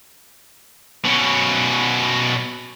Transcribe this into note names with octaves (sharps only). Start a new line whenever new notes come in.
B2 C#4